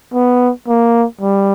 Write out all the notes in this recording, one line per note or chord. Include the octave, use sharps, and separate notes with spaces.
B3
A#3
G3